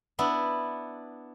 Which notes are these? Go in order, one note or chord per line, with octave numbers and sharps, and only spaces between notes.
B3 D4 E4